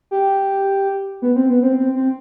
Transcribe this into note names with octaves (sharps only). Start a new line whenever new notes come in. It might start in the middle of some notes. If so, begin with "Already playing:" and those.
G4
B3
C4
B3
C4
C4
C4